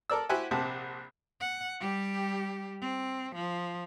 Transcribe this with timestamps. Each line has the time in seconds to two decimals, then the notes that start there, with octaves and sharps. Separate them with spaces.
0.10 A4 A#4 D5 E6
0.29 E4 F#4 G4 C5 F#5 G#5
0.51 A#1 C3 C5 F#5 A5
1.41 F#5
1.80 G3 G4
2.81 C4
3.35 F3